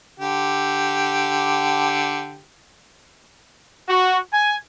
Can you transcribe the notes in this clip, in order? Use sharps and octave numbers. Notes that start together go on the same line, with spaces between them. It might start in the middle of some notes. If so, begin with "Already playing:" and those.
D3 G4
F#4
G#5